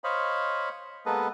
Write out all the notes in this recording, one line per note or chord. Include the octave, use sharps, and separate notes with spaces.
C5 C#5 D#5 F5 B5
G#3 A#3 B3 A4 B4 D#5